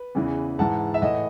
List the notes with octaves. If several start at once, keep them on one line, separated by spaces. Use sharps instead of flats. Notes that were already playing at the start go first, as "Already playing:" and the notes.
Already playing: B4
E2 C#3 E3
G#2 E3 F#5 A5
E5
A2 E3 D#5 F#5